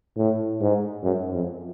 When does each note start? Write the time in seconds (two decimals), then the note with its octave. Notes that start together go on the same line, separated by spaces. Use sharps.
0.17 A2
0.61 G#2
1.03 F#2
1.33 F2